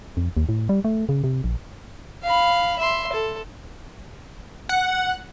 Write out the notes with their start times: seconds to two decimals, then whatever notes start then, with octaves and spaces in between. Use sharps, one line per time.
0.17 F2
0.37 D#2
0.49 A2
0.69 G3
0.85 A3
1.09 C#3
1.24 C3
1.44 A#1
2.23 F5 B5
2.79 E5 C6
3.13 A4
4.69 F#5